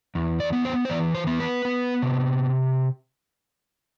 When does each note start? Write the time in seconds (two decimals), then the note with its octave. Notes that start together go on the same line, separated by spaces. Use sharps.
0.15 E2
0.40 D5
0.53 B3
0.65 C5
0.85 C5
0.89 E3 D5
1.15 C5
1.27 B3
1.40 B4
1.65 B3
2.02 C3